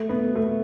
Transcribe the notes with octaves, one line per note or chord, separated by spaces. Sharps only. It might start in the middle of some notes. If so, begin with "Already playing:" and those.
Already playing: A3
B3
A3